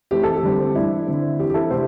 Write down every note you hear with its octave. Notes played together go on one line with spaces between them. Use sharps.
E3 A3 C4 G4
A4
G4
D3 G3 C4
E3 G3 D4 E4
D3 C4
E3 C4 G4
G4
E4 A4
C3 A3 D4 G4 C5